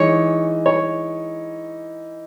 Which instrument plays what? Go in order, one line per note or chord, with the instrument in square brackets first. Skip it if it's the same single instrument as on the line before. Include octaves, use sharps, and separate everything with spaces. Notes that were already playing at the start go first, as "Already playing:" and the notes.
Already playing: [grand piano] E3 G#3 D#4 [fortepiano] C#5
[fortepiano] C#5